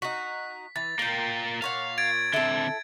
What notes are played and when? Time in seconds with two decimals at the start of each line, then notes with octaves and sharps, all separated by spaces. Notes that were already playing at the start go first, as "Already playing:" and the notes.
0.02 D#4 F#4 B6
0.76 E3 A6
0.99 A#3 F4 A#4 G5
1.62 A#2 C#5 F5 F#5
1.98 G#6 A6 D7
2.33 D3 C4 E4 A4